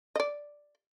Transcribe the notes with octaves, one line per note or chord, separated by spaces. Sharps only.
D5 D#5